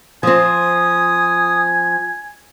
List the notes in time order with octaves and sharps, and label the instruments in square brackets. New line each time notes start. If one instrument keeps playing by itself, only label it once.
[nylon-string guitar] F3 C4 [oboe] G#5 [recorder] D#6